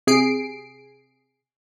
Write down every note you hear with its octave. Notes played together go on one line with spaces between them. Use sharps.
C3 G#4 C7 D7